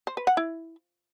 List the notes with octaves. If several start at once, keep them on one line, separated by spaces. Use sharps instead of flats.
C5
B4
F#5
E4